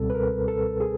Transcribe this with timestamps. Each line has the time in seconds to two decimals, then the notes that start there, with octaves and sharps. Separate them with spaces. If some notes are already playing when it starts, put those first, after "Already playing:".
Already playing: C#2 B2 G3 C4 A4
0.10 B4
0.14 A#4
0.48 A4
0.80 G#4